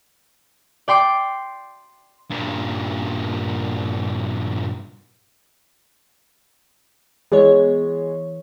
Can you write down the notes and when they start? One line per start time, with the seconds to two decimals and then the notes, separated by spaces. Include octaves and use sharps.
0.88 D5 G5 C6 D6
2.31 G2 A#2
7.32 E3 G#3 B3 C#5